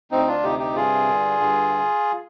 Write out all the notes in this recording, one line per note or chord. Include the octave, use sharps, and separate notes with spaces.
D2 C4 D#4
D4 F4
C3 D#4 G4
D#4 G4
G2 F4 G#4
D3
G2